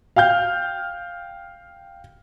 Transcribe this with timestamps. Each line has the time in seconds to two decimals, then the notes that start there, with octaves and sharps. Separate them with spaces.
0.16 F5 G5 F6 G6